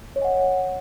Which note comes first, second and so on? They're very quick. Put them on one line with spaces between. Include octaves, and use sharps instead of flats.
C#5 D#5 G#5 F#5